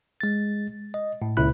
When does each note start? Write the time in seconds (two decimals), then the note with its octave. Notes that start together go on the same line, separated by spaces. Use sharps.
0.21 G#3 A6
0.94 D#5
1.22 A2
1.37 C#2 A#2 C#3 E4 B5 F#6